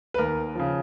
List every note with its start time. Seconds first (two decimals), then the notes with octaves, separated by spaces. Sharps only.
0.14 B4
0.18 D#2 A#4
0.55 C#3 F3